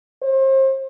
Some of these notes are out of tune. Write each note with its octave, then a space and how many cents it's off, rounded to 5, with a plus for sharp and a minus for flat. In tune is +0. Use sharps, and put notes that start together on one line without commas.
C5 +35